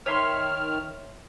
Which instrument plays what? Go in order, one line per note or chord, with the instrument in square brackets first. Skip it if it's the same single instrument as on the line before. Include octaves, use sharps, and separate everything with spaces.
[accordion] D#3 F6 [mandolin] C#5 E5 C6